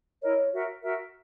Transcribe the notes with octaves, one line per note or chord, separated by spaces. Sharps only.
E4 A#4 C#5 D#5
F#4 A#4 E5
F#4 A#4 E5